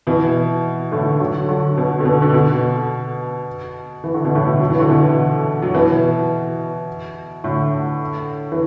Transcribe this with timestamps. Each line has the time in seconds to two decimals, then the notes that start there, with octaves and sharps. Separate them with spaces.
0.07 B2 E3
0.92 A2 D3
1.20 D3 F#3
1.49 D3 F#3
1.77 B2
2.00 D3
2.05 B2
2.22 D3
2.34 B2
4.04 E3
4.14 D3
4.25 B2
4.35 A2 D3
4.60 F#3
4.70 E3
4.80 D3
4.89 B2 E3
5.62 F#3
5.74 B2 E3
7.44 A2 D3
8.52 E3